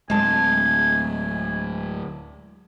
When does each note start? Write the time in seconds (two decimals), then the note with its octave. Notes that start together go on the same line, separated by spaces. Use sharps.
0.10 D1 G#3 G#5 A5